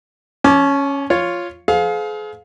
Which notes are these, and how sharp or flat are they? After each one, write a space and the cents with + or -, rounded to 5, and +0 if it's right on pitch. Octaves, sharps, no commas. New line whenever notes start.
C#4 +0 A5 -45 D6 +0
F4 +0 C#5 +0 F5 +0
G#4 +40 C5 -45 F5 +20